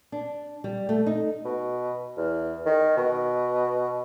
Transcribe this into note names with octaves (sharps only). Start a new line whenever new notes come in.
D4
G3
A3
D#4
B2
E2
D#3
B2